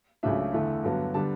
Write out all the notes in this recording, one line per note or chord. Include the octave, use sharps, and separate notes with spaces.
C#2 C#3 F#3 A3 D4 E5
E2 D3 A3
G2 D3 F#3 B3
D3 G3 B3 D4 A5